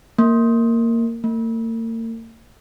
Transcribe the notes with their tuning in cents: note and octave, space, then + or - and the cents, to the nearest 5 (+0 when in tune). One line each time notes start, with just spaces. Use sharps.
A#3 -15
A#3 -45